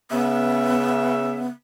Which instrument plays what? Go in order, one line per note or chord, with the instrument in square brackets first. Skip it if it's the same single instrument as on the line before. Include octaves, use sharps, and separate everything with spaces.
[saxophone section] C#3 E5 [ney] B3